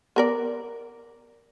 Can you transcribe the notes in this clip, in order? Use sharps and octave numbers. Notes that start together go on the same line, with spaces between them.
B3 A#4 D5